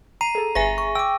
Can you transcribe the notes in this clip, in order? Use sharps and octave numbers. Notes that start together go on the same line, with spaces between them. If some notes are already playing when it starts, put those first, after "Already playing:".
A#5 C7 D#7
G#4 A4
G1 G#4 B4 E5 G#5 A#6
C#6
G5 D6 E6